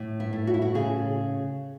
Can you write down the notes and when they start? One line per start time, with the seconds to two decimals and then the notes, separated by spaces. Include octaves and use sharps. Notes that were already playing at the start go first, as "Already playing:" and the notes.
Already playing: A2
0.20 E4
0.33 A2
0.47 F#4
0.54 E4
0.62 F#4
0.74 C#3 G#4